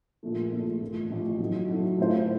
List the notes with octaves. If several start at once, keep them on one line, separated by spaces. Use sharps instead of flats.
A#1 A#2 F3 A3
A#1 A#2 F3 A3
A1 A2 F3
A1 A2 F3
A2 F#3 A3 D#4
A2 F#3 A3 D#4
A2 A3 C#4 F4 C5